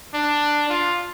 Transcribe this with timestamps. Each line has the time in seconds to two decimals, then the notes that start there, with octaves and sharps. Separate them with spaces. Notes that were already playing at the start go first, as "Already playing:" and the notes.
0.14 D4
0.70 F4